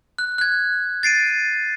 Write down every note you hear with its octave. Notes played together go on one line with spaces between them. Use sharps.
F#6
F#6 G#6
A6 C7 D7 D#7